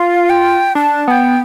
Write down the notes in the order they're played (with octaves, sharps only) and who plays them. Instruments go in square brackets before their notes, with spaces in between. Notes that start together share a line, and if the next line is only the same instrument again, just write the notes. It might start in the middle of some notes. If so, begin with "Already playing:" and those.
Already playing: [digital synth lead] F4 [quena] F5
[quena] G5
[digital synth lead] D4 [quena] A5
[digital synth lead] B3 [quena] G5 A5